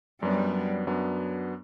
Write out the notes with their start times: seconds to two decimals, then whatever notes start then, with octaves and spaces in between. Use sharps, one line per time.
0.22 F#2 F#3 G3 B3 D4
0.87 F#2 F#3 B3 D4